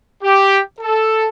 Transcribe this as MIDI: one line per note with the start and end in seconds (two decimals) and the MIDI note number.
0.23 0.61 67
0.81 1.28 69